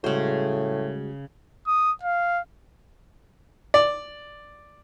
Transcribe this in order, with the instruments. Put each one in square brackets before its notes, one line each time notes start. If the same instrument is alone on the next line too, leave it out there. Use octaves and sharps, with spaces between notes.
[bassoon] A2 [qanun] C#3 C5 [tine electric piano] G3 G#3 F#4
[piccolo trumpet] D#6
F5
[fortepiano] D5